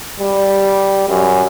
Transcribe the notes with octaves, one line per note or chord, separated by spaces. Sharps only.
G3
F#2